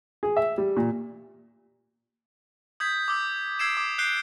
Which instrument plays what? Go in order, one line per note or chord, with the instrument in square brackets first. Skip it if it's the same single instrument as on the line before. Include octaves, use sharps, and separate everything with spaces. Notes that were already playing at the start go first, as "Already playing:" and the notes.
[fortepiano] G#4
E5
G3
A#2
[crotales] D#6 G6 G#6 B6
D6 E6 G6
E6 G#6 C7 D7 E7
D6
F#6 G6 C7 D7 G7